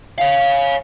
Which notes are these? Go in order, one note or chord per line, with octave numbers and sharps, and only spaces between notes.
C#5 F5